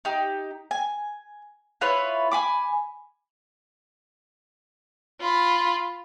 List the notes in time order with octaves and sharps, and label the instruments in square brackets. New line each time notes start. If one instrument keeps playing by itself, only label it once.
[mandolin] D#4 G4
G#5
E4 F4 B4 C#5
G#5 B5 D6
[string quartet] F4 B5